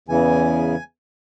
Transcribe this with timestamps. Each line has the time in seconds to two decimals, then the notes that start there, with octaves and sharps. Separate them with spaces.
0.08 E2 C#3 E3 G#5